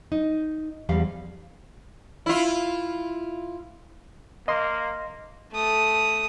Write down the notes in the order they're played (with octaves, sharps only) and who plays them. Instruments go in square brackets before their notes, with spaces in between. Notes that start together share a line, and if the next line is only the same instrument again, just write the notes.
[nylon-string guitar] D#4
E2 F3 G3 F5
[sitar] E4 F4
[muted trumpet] A#3 [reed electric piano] D#5 C6
[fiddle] A3 D#6